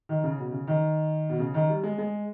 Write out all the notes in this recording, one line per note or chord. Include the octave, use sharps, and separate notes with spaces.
D#3
C#3
B2
C#3
D#3
B2
C#3
D#3
G3
G#3
G#3